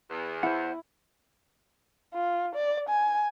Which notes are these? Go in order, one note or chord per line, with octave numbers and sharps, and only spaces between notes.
E2
E4 C5 F#5
F4
D5
G#5